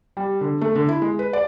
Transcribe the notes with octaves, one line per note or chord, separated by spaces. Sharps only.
G3
D3
A3
D3
E4
G#3
B4
D5